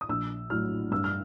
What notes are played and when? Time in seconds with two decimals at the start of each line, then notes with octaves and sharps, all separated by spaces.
0.01 D#6
0.09 A#1 E6
0.50 A2 F#3 F6
0.91 G2 E6
1.04 F6